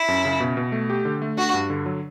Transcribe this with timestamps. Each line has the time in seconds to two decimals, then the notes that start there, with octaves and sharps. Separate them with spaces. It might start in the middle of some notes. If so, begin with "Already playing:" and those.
Already playing: E4
0.08 F#2
0.25 C#3
0.40 B2
0.57 B2
0.72 A3
0.90 G4
1.05 D3
1.22 A3
1.37 D4 F#4
1.54 G2
1.70 D3
1.86 F#3